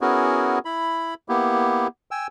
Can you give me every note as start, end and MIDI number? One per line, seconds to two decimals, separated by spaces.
0.01 0.59 59
0.01 0.59 61
0.01 0.59 64
0.01 0.59 66
0.01 0.59 68
0.01 0.59 70
0.65 1.14 64
0.65 1.14 83
1.29 1.87 58
1.29 1.87 59
1.29 1.87 64
1.29 1.87 67
2.11 2.27 79
2.11 2.27 80
2.11 2.27 88